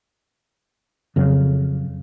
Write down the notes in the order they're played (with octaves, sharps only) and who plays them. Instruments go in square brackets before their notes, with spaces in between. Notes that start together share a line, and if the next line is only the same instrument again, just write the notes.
[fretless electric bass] F2 C#3 F#3